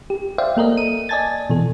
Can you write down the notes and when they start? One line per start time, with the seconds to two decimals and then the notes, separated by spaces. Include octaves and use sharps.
0.10 G4
0.38 C5 D5 E5 F5 G5
0.57 A#3 A4 A#4 D#5
0.77 D#7
1.09 D5 D#5 G#5 A5 G#6 A6
1.50 B2 E3 A4